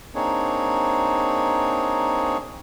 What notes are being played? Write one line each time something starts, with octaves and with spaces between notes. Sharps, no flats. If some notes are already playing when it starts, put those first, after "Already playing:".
A#3 C4 D4 D#4 G#4 C#5